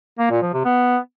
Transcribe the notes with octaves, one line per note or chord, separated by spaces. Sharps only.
A#3
A#2
F3
C3
B3